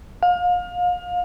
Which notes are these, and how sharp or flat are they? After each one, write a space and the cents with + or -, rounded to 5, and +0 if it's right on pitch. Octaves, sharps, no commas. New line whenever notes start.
F5 +30